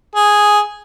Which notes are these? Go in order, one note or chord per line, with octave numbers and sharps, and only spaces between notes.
G#4